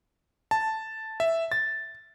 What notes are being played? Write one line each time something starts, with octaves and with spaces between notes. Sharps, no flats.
A5
E5
A6